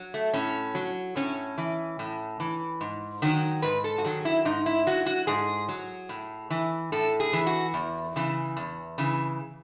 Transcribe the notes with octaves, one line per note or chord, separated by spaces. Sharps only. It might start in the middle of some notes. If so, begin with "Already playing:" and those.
Already playing: F#3
A3
A2 C#4
F#3
A2 C#4
E3
A2
E3
G#2
D#3 F#3
G#2 B4
A4
F#4
D#3 F#3 G#4
E4
G#2 D#4
E4
F#3 F#4
F#4
G#2 G#4
F#3
A2
E3
A2 A4
G#4
E3
F#4
E2
C#3 E3
E2
C#3 E3